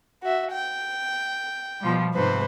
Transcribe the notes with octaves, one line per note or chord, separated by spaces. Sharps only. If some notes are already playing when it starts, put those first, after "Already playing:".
F#4 E5
G5
B2 F3 G3
G#2 C3 B4 C5